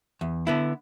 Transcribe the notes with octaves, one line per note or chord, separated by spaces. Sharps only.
E2
D3 B3 E4